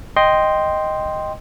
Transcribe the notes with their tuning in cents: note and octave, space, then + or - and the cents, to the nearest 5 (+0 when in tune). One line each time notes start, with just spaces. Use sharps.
D#5 +0 G5 +0 C6 +0